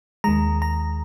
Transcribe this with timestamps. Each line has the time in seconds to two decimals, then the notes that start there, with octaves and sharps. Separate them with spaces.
0.24 D#2 D#3 G#3 A#5
0.62 A#5